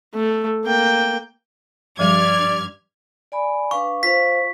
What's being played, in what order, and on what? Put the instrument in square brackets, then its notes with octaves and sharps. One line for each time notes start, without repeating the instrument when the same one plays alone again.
[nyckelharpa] A3
A#3 G5
[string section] G2 F6 G#6 [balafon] F3 G3 [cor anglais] D5
[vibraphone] D5 G#5 B5
[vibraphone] D4 B4 F5 [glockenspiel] C#6
[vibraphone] F4 C5 F5 [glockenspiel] B6